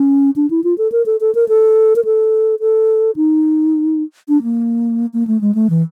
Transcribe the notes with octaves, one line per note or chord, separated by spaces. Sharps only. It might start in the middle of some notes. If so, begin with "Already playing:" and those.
Already playing: C#4
D4
E4
F4
A4
A#4
A4
A4
A#4
A4
A#4
A4
A4
D#4
D4
A#3
A#3
A3
G#3
A3
E3